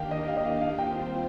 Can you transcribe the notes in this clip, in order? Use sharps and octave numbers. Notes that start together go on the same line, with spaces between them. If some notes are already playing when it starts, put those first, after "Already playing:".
Already playing: D#2 D#3 A#3 D4 G4 F5 G5
D#5
F5
D#5
F5
F5
G3 C4 F4 C5 G5